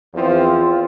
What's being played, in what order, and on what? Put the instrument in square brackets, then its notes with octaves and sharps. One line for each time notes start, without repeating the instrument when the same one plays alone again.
[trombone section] E2 F3 C4 [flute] F4